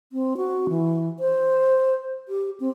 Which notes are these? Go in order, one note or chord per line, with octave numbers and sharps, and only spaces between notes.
C4
F#4
E3
C5
G4
C4